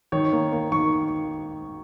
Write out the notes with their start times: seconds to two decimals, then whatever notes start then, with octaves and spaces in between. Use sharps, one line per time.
0.12 D#3 C#5
0.33 A#3
0.52 A#3
0.72 D#3 C#6